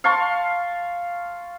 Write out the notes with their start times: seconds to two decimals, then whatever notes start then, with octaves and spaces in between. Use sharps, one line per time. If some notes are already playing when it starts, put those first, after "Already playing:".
0.04 F5 A5 C6 C#6